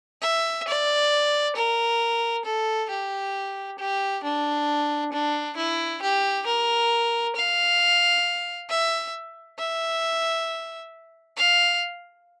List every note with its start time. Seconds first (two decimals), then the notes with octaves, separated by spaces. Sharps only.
0.22 E5
0.68 D5
1.56 A#4
2.45 A4
2.90 G4
3.79 G4
4.24 D4
5.13 D4
5.57 E4
6.02 G4
6.47 A#4
7.36 F5
8.70 E5
9.59 E5
11.37 F5